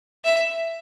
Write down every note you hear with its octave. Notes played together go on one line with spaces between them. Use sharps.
E5